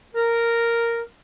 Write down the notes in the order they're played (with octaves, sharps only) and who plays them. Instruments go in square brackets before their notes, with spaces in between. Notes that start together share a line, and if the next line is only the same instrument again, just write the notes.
[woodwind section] A#4